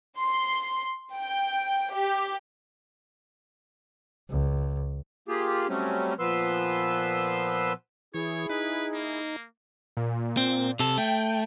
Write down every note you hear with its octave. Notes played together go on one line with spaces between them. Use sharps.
C6
G5
G4
C#2
A#3 F4 G4 G#4
F#3 G3 A3 C4 C#4
A#2 F3 B3 B4 C6 E6
E3 E4 G#4 C#5
D#4 B4
A#3
A#2
C4
C3 A4
A3 G5